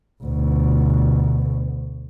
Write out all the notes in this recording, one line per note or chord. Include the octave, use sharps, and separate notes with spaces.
D2 B2